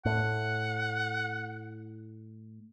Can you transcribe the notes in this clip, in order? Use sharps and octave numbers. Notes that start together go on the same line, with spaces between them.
A2 F#5